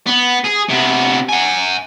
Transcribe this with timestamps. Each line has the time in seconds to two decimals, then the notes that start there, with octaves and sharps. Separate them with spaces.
0.07 B3
0.44 G#4
0.69 C3 B3
1.29 F#5 G#5